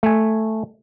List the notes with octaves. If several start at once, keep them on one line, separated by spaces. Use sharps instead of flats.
A3 G#5